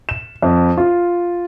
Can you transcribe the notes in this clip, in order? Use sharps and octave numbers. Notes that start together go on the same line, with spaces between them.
E7
F2
F4